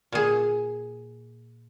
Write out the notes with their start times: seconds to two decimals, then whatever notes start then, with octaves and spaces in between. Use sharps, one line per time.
0.12 A#2 G#4